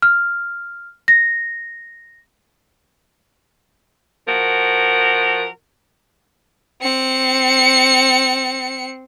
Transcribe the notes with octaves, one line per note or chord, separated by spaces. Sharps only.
F6
A#6
F3 F#4 A#4
C4 C#7